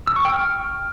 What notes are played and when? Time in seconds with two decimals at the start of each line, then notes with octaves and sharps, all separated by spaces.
0.07 E6
0.16 C#6
0.25 G5
0.34 F6